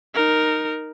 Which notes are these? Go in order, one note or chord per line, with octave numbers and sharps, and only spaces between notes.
D#4 A#4